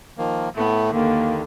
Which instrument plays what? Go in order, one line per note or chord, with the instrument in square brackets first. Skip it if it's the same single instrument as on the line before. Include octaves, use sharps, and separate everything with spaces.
[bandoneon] D#3 F3 A#3
[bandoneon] A2 A3 [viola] B3
[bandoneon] D#2 D#3 [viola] D3 [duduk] A#3